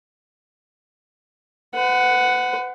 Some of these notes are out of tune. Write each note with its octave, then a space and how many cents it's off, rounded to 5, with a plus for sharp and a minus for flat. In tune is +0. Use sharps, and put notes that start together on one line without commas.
B4 +40 F#5 +0